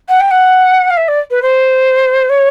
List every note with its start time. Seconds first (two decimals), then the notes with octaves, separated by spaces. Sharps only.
0.08 F#5
0.20 G5
0.31 F#5
0.90 F5
0.97 E5
1.08 D5
1.31 B4
1.42 C5
2.29 C#5